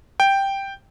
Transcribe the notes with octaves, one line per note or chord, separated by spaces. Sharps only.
G5